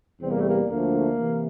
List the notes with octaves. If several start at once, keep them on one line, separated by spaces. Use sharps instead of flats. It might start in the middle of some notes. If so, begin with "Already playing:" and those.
E2 C3 G3 C4
A#3
A3
A#3
D2 D3 F3 A3 A#3
C3 E3